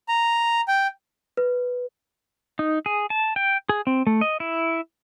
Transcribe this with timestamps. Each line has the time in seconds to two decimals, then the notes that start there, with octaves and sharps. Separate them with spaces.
0.09 A#5
0.68 G5
1.37 B4
2.59 D#4
2.86 G#4
3.10 A5
3.36 G5
3.69 G#4
3.87 C4
4.07 A3
4.21 D#5
4.40 E4